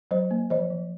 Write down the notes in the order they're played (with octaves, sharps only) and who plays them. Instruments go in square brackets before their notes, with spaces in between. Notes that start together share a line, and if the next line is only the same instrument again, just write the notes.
[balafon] F#3 C5 D#5
A#3
F3 C5 D#5
F3